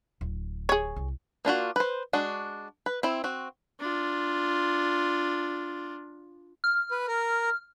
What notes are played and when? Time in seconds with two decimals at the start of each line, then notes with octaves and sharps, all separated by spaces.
0.21 D1
0.69 G#4 C#5
0.96 C2
1.45 A#3 D4 F4 F#4
1.76 B4 C5
2.13 G#3 D4 F#4
2.86 B4
3.03 C4 E4
3.24 C4 F#4
3.80 D4 F4
6.64 F6
6.91 B4
7.08 A#4